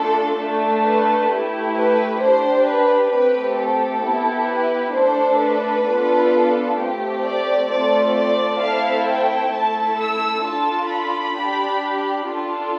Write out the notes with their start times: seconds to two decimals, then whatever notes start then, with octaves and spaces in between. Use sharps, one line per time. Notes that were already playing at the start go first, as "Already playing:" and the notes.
Already playing: A3 D4 F4 A4
0.38 A3 D4 A4
0.84 B4
1.29 A3 E4 G4
1.75 B4
2.21 D4 G4 C5
2.67 B4
3.12 A3 C4 G4 B4
3.58 A4
4.04 B3 E4 G4
4.50 B4
4.95 A3 D4 A4 C5
5.41 B4
5.87 B3 D4 F4 A4
6.78 A3 C4 G4
7.24 D5
7.69 A3 C4 F4 A4 D5
8.15 D5
8.61 A3 C4 E4 A4 F5
9.06 G5
9.52 A3 E4 A4 A5
9.98 E6
10.44 D4 F4 A4 A5
10.90 B5
11.35 D4 G4
12.26 D4 F4 A4